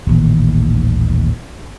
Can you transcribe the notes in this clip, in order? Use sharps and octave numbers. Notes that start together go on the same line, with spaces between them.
D#1 A1 D#2